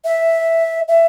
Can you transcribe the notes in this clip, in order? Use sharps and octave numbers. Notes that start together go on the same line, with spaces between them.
E5
E5